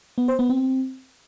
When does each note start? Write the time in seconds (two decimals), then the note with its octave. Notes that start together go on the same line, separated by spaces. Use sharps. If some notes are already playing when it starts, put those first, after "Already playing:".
0.18 B3
0.28 C5
0.39 B3
0.50 C4